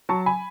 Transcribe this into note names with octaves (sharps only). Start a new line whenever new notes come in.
F#3 A5 C#6
G#5 B5